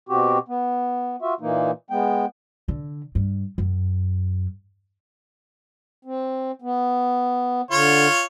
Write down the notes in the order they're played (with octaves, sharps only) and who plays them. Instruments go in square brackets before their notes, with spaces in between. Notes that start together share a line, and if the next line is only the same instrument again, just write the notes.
[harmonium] B2 C4 F#4 G4
B3
F4 F#4 E5
A#2 E3 A#3 D#4
G#3 B3 G5
[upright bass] D3
G2
F#2
[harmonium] C4
B3
[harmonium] D3 [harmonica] F4 C#5